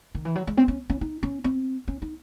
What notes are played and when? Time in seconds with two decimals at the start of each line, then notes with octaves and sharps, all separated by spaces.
0.15 D#3
0.25 E3
0.35 F#3
0.47 G#3
0.57 C4
0.68 C#4
0.90 C#4
1.01 D#4
1.23 C#4
1.44 C4
1.88 C#4
2.02 D#4